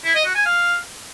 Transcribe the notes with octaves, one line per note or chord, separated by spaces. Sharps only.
E4
D#5
F#4
G#5
F5